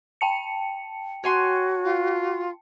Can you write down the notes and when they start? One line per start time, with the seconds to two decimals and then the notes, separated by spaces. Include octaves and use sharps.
0.21 G5 A5 C#7
1.24 F#4 C#5 G#5 C6
1.84 F4